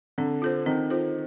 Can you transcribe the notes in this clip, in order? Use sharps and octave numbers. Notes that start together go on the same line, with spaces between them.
D3 C4
F4 A4 C5
D#3 C4
F4 A4 C5